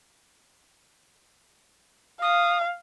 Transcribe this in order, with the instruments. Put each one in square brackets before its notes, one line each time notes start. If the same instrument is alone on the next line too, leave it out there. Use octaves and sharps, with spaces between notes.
[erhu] F5 [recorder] D#6